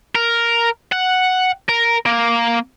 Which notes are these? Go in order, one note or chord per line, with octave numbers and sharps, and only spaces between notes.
A#4
F#5
A#4
A#3